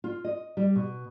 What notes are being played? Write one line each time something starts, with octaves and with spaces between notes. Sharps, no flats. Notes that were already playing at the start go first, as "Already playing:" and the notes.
F4
D#5
G3
B2